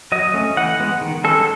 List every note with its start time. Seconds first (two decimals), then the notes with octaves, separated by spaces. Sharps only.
0.12 F#3 D#5
0.34 A3 C#4
0.57 E3 F#5
0.80 G#3 B3
1.01 D#3
1.24 G#3 C#4 A4